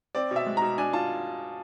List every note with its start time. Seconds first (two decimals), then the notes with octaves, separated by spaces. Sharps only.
0.15 C4 D5
0.31 B2
0.36 E5
0.46 G#3
0.57 B2 A#5
0.78 D4 G#5
0.93 F4 A5